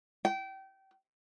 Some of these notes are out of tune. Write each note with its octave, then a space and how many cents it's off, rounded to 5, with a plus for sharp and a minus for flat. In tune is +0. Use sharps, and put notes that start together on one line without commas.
G5 -25